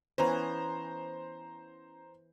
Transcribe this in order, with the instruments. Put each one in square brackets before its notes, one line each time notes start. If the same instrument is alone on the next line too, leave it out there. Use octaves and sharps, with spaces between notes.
[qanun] E3 B3 C#4 [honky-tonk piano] C5 A#5